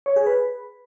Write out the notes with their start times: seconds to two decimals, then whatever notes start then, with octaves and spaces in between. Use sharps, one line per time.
0.06 C#5
0.16 G#4
0.26 B4